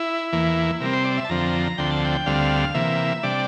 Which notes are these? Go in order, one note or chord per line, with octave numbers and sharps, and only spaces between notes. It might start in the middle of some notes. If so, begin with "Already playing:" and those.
Already playing: E4
E2 E3 A#3
C3 G3 C4 A#4
C5
D5
E5
A5
F2 D3 F3 C4 A#5
D2 D3 F3 C4 G5
A5
G5
D2 D3 G3 C4 F5
C3 E3 A#3 E5
C3 G3 D4 D5